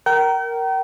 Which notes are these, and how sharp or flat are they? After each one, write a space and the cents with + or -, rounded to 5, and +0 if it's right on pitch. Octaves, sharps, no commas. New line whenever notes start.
A#4 +0 G5 -40